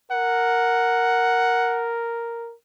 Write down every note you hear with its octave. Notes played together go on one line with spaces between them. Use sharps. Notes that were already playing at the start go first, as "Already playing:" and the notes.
A#4 F#5